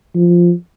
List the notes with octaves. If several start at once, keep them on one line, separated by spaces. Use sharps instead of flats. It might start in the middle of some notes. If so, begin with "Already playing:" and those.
F3